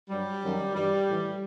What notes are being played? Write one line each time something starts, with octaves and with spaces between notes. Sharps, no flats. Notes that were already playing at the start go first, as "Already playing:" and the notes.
G2 F#3 G3
F#2 D#3 F#3
G2 E3 G3
A2 E3